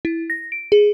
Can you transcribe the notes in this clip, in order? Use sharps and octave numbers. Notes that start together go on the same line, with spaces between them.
E4
A#6
D7
G#4